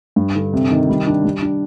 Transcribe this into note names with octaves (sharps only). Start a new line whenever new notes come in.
G2
D3
C3
D#3
G3
D4
G3
D4